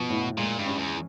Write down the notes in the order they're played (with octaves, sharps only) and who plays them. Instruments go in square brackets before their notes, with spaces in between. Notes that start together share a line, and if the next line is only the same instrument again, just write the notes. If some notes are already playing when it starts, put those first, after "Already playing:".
Already playing: [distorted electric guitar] B2 [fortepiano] F3
[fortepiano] A2
[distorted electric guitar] A#2 [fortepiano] G#3
[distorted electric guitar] G2
[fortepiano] C#4
[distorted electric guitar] E2